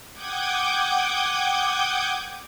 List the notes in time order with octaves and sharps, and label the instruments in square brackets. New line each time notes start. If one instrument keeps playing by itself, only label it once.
[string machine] F#5 G5 D6 D#6 G6 G#6